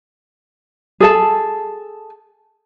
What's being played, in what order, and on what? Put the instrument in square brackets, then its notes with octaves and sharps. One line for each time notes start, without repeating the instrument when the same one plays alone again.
[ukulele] G#4 A4 A5